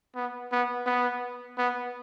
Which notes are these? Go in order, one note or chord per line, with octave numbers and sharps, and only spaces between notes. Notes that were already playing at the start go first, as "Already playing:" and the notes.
B3
B3
B3
B3